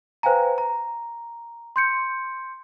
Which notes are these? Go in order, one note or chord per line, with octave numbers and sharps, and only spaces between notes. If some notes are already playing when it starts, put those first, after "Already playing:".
B4 C5 F5 G5 G#5 A#5
A#5
C6 G6 C#7